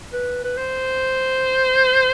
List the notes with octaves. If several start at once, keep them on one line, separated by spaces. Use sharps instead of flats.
B4
B4
C5